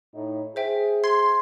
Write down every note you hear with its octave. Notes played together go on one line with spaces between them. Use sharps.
A2 D#4
G#4 C5 E5 G5
C6 G#6